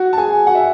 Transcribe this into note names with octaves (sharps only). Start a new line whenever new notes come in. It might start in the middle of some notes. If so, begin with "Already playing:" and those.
Already playing: F#4 F#5
A5
G#4 G#5
F#4 F#5
E5